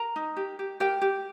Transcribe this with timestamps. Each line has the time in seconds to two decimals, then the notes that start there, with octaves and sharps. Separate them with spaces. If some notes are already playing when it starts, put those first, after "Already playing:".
Already playing: A#4 A#5
0.16 D#4
0.37 G4
0.59 G4
0.80 G4 A#4 G5
1.02 G4